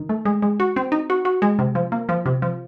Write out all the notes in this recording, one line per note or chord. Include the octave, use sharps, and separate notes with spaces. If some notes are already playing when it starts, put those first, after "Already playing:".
Already playing: D#3
A3
G#3
G#3
F#4
C4
D#4
F#4
F#4
G#3
C3
F3
A#3
F3
C3
F3